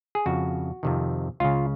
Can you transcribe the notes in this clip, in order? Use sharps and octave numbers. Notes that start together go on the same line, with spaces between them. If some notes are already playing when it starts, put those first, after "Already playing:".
G#4
F2 C#3 F#4
F2 C3 D#3
C#2 C#3 F4